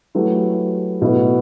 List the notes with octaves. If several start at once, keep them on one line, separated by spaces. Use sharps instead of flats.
F#3 A3 E4 G4 B4
B2 A3 E4 B4